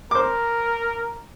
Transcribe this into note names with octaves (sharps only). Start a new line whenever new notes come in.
A#4 C5 D6